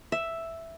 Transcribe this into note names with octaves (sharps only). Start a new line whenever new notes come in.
E5